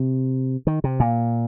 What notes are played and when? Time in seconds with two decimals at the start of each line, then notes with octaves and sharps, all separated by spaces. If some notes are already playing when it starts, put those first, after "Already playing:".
Already playing: C3
0.67 D#3
0.84 C3
1.00 A#2